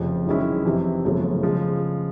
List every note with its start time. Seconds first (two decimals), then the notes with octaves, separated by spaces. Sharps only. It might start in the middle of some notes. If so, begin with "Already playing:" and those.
Already playing: F1 F2 C#3 F3
0.26 F#2 D#3 G#3 C#4 E4
0.65 F2 C3 E3
1.04 G1 F#2 C#3 F3 A3
1.43 C#3 F3 G#3